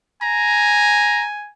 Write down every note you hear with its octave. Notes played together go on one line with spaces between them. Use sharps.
G#5 A#5